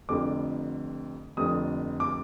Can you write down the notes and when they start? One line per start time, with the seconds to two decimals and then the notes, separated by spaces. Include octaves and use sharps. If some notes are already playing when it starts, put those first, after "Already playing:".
0.09 F1 F2 D3 D6
1.37 F1 F2 D3 D#6
2.00 D6